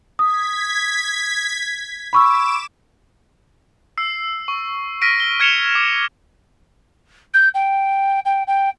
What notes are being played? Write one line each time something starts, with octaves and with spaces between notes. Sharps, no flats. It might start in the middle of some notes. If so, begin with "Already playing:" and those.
D#6 G#6 B6
B5 C#6 D6 E6 E7
E6 C7
C#6
F6 A#6 B6 D7 D#7
G7
F6 G#6 C#7 E7 F7 G7
D6
G6
G5
G5
G5